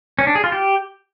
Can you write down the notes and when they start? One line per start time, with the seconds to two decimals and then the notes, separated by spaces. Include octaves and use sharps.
0.19 C#4
0.27 D4
0.35 G#4
0.44 F4
0.52 G4